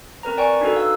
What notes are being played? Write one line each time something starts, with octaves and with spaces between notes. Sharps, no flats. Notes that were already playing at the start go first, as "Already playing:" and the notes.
C4 A#4 B4 A#5
D5 G5 G#5 C#6
D4 D#4 F#4 A4 B4
F5 E6